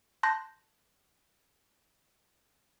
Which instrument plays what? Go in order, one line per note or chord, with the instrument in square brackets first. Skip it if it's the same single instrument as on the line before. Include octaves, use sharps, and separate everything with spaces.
[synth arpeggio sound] A5 C6 F#6 G6 A#6